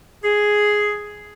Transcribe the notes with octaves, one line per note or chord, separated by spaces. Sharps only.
G#4